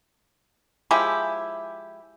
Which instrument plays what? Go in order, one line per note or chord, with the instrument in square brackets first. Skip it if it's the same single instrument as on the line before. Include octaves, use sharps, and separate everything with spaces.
[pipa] F3 G#3 E4 G4